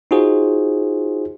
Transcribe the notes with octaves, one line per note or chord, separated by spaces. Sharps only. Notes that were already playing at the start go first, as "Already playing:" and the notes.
D#4 F4 F#4 G#4 C5